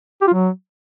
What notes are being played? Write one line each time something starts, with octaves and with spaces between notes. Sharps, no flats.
G4
F4
F#3